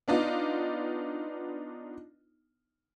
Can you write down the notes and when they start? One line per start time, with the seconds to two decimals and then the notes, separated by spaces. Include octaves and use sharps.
0.08 B3 D4 D#4 F4